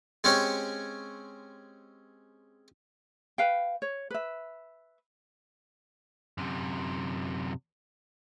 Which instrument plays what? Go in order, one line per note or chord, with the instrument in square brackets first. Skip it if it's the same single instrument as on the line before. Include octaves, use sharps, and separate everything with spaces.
[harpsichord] G#3 C4 C#4 G4 C#5
[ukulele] B4 F5 G5
C#5
B4 E5
[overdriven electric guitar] F#2 C3